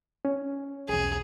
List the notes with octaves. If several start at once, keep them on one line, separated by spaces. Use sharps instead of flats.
C#4
B1 E2 G#4